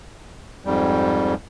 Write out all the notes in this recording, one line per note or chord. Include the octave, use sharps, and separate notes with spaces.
F2 G#2 G3